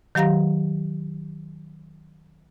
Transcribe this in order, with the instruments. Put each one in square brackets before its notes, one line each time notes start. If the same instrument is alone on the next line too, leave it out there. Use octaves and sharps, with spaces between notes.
[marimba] D#3 F#3 G4 F5 A#5 A#6